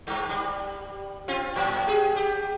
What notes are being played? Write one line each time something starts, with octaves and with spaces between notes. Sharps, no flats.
G2
G3
C4 F4
A2 F#3
G4 G#4
G4